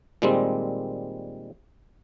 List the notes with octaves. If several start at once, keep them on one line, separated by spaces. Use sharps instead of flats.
A#2 D#3 G3 G#3 C4